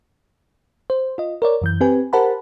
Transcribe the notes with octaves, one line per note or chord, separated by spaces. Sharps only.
C5
F4 D#5
A#4 C#5 D5
F#2 E3 G6
C4 G4 B4 G#5
G4 A#4 C5 F#5 A5 B5